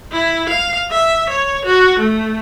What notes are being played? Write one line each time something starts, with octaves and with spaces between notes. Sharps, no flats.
E4
F5
E5
C#5
F#4
A3